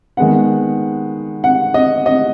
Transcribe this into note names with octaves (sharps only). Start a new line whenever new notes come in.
D#3 G#3 B3 F#5
F#5
D#5
D#5